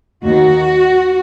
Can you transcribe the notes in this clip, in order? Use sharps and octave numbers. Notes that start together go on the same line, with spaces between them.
D#2 D#3 F#4